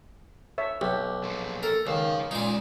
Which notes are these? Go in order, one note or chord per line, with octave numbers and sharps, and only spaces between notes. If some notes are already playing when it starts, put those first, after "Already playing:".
C#5 E5
B1 G4
A#2 F3
A4 A#4
C#2 D#3 F3 F5
C#2 A#2 G#3 D#4 D5